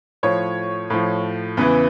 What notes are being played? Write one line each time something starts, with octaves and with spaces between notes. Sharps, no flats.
A2 F3 C#5
A2 F3
E2 C#3 E3 B4